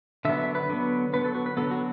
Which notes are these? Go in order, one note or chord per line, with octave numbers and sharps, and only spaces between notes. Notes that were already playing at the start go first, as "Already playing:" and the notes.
D3 F#3 B3 E5
E5
B4
D3 F#3 B3
D3 F#3 B3 B4
A4
F#4
B4
D3 F#3 B3 A4
F#4